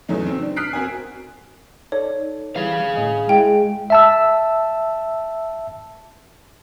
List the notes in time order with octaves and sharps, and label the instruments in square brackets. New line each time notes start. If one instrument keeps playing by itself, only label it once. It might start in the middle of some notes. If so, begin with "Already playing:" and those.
[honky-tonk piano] E2 G#2 C#3 F#3 A3 D#4
C4 C#4
D4
D#6 F6 F#6 B6 C7 D7
C4 F#4 A#4 G#5
[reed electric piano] D#4 A4 D5 [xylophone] C#5
[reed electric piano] E3 G3 [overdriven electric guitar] G#4 F5
[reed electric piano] A2 D#5 G#5
[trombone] G#3 [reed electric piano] E4 [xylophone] G5
[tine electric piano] E5 A5 E6